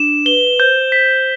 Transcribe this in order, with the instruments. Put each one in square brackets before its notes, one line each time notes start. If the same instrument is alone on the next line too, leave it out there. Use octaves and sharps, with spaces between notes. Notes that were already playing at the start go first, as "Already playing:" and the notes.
Already playing: [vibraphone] D4 [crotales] E7
[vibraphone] B4 [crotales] G7
[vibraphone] C5 [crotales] G6
[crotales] B6